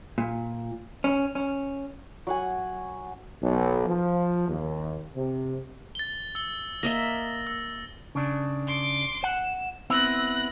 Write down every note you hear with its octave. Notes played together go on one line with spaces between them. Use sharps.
A#2
C#4
C#4
F#3 F#5 G#5
B1
F3
D#2
C3
A6 G7
E6 G7
A#3 D#5 E5 A#6
E6
C#3 D4
C6 D6
F#5 E7
B3 C4 E4 F#6 A#6